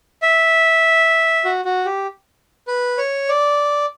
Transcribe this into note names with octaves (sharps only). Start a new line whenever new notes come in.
E5
F#4
F#4
G4
B4
C#5
D5